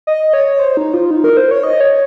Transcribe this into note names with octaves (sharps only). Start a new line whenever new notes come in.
D#5
C#5
C5
D#4
F4
D#4
A#4
C5
C#5
D#5
C#5